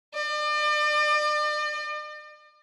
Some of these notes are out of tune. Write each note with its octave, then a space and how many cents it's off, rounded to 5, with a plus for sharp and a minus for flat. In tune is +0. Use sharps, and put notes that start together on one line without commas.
D5 +40